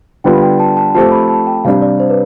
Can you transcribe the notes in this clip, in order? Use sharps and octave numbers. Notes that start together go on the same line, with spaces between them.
D3 G3 B3 F4 G5
G5
A5
A5
F3 A3 C4 G4 A5
B5
A5
G5
C3 G3 D4 F5
D5
C5
B4